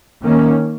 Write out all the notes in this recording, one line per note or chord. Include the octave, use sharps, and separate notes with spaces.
D#3 A#3 C#4